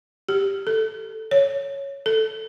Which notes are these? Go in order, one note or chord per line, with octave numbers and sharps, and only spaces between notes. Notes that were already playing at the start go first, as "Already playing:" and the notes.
G4
A4
C#5
A4